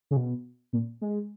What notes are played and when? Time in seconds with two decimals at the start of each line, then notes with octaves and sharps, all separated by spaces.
0.11 C#3
0.17 B2
0.73 A#2
1.02 G#3